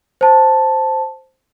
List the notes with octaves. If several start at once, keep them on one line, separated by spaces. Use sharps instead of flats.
C5 A5